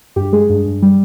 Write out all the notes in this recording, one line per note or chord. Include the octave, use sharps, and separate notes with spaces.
G2 G4
G#3 G#4
G2
G2
G3